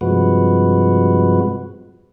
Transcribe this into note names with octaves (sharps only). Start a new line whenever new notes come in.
G2 C3 F3 G#3 F#4 B4